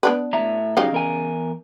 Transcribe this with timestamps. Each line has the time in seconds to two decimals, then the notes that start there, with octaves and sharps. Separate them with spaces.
0.03 B3 D4 B4
0.33 A2 E5 A#5
0.77 C#3 F#3 D#4 G4 D#5 F5
0.92 E2 A#4 G#5